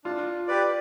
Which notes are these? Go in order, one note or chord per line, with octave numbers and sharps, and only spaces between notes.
D4 F4
G4 B4 D5